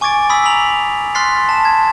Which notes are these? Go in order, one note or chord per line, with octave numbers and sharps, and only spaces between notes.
G#5 C#6 D6 G#6 A6 D7
B5 D#6 E6 B6
A#5 B6 F7 F#7
C6 F6 F#6 A6 B6 C7
A5 E7
G#6